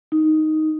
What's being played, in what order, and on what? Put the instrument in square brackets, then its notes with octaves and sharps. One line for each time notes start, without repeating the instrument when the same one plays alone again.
[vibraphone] D#4